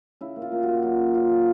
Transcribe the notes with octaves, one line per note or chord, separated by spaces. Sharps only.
C#3 E4
A#3
F4
A#3
A#3 F#4
F#3 F4
C#3
C#3 F4
F#3